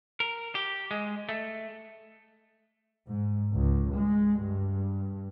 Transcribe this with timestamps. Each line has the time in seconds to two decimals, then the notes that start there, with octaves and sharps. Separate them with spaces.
0.20 A#4
0.55 G4
0.91 G#3
1.29 A3
3.08 G#2
3.56 C#2
3.96 G#3
4.44 G2